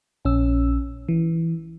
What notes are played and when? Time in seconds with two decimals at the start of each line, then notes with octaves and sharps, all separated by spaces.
0.25 A#1 C#4 E6
1.09 E3